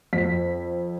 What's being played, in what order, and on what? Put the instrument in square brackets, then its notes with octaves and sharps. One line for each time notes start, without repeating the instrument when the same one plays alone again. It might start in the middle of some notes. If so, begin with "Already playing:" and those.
[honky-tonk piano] F2 B6